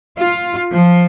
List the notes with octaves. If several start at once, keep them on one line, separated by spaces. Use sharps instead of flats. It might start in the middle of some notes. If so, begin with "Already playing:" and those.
F4
F3